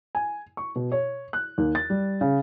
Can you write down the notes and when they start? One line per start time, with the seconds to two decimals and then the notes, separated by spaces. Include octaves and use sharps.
0.15 G#5
0.57 C#6
0.76 B2
0.92 C#5
1.33 F#6
1.58 D#2
1.75 A6
1.90 G3
2.21 C#3